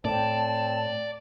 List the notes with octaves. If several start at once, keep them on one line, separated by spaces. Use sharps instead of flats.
A2 C4 D5 A5